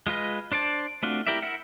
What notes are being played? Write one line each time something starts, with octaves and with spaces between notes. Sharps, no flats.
G#3 F4 B4 D#5
D4 C5 D5 A5
A3 C4 D4 F4 F#4
E4 G4 A#4 D5 E5
E4 A#4 E5 F#5